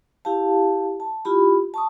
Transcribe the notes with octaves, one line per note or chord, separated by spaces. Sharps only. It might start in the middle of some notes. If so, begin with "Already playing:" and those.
E4 G4 F5 A5
A5
E4 F4 G4 B5
A5 C#6 D#6